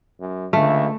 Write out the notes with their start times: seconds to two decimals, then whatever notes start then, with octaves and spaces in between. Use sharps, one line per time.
0.20 F#2
0.53 C#2 D3 A3 E5